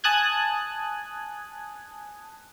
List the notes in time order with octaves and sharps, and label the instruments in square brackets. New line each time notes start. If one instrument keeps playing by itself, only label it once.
[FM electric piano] G#5 A5 D#6 F#6 G#6